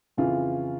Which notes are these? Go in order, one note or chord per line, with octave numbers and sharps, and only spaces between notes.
F2 C#3 E3 F4